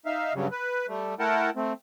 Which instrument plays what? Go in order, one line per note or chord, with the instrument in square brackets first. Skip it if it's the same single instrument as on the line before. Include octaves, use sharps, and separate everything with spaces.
[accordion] D#4 E5 F5
G2 C#3 F#3 G3
B4
G3 A3
A3 E4 A#4 F#5 G5 A5
A3 C4